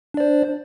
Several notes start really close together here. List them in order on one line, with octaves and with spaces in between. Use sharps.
D4 D5 C5